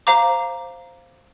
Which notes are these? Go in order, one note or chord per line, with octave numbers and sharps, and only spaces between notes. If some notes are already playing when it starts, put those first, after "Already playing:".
C5 F5 A#5 D6